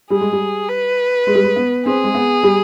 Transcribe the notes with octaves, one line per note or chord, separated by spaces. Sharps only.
G3 G#4
G#3
G3
B4
G#3
G3
G#3
B3
C4 G#4
G#3
B3
G3